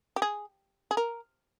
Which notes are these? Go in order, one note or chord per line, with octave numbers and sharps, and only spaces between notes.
G4
G#4
G#4
A#4